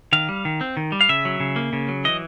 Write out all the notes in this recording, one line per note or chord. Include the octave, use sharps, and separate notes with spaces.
D#3 F5
G3
D#3
C4
D#3
G3
F5
C#3 E5
F#3
C#3
A#3
C#3
F#3
E3 D#5